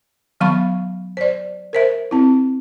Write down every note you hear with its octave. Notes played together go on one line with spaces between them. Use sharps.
D#3 F#3 B3 F5 B5 C#6
C5 D5
A#4 C5 E5
C4 E4